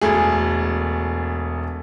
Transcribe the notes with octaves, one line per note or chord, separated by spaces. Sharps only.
E1 A3 G#4